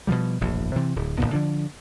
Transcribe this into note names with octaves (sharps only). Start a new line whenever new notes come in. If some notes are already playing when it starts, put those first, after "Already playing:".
B2 D3 F3 G3
E1 A#1 F#2 A2
C3 E3 C4
D1
G1 D#2 A#2 B3
D3 F3 D4